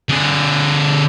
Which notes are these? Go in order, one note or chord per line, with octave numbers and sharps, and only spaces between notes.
D3 G#4